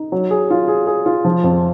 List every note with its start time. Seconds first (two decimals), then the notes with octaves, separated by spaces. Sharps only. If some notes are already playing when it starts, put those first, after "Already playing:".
Already playing: D#4
0.12 F#3
0.31 G#4
0.50 F4
0.68 G#4
0.87 G#4
1.06 F4
1.25 F3
1.44 F2